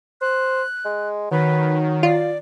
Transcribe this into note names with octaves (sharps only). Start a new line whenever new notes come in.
C5 F#6
G#3
D#3 F#3 B4
F4 D5